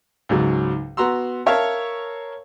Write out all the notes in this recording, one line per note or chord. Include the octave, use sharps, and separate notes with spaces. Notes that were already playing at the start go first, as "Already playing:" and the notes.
C#2 G#2 F#3
B3 F#4 A#5 C6 E6
A#4 C#5 E5 F5 A5